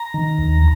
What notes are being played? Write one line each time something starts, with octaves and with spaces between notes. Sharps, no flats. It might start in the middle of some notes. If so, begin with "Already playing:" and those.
Already playing: A#5
D#3
D#2